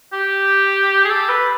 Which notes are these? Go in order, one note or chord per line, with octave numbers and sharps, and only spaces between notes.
G4
G#4
A4
B4